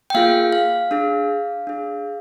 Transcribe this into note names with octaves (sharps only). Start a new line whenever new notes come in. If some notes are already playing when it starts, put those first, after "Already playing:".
G5
A#3 F4 G#4 F5
F5
D4 G#4
D4 G#4